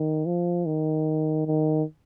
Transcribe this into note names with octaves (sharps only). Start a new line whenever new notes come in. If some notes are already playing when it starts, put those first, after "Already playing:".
Already playing: D#3
F3
D#3
D#3